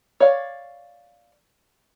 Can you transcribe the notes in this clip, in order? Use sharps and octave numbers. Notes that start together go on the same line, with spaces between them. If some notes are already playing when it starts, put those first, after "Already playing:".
C#5 D5 F5